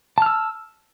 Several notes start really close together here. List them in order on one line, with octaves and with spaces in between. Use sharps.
A5 F6 E6